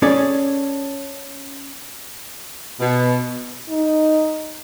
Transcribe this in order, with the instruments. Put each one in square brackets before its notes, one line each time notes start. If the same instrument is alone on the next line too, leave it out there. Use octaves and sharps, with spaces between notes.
[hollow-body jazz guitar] C#4 G#4 A4 C#5 D5
[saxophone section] B2
[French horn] D#4